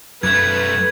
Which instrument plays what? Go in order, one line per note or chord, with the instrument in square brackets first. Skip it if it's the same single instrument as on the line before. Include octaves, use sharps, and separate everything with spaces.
[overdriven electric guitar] B1 A3 [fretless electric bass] F#2 [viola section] B4 [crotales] G#6